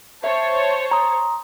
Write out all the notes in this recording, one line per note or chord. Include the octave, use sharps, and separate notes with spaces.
C5 C#5 E5 A5
A#5 C6 D#6